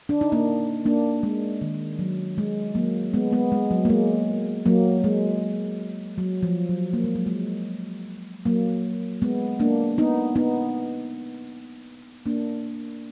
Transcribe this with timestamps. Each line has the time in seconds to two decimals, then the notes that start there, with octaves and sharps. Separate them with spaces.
0.09 D4
0.21 D#4
0.32 A#3 D4
0.85 A#3 D4
1.23 G#3
1.61 D#3
1.99 F#3
2.38 G#3
2.75 F#3 A#3
3.14 G#3 B3
3.33 G#3 B3
3.52 G#3
3.71 F#3
3.85 A#3
3.90 G#3
4.66 F#3 A#3
5.04 G#3
6.18 F#3
6.43 F3
6.69 F#3
6.93 A#3
7.04 G#3
7.15 F#3
7.26 G#3
8.45 F#3 A#3
9.22 G#3 B3
9.60 A#3 D4
9.98 B3 D#4
10.35 B3 D#4
12.26 A#3 D4